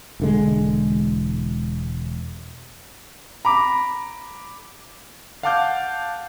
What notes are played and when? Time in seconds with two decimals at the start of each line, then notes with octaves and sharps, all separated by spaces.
0.20 E1 D3 G#3
3.45 A#5 B5 D6
5.43 F5 F#5 A5 D6 F6 G6